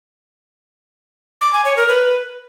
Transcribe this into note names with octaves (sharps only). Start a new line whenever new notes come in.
D6
G#5
C#5
A#4
B4